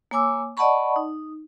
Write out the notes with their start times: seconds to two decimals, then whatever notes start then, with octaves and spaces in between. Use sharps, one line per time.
0.11 A#3 C#5 G#5 D6 E6
0.57 D5 D#5 F#5 A5 B5 C#6
0.96 D#4